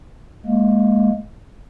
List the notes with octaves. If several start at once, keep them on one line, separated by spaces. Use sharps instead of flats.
G#3 A#3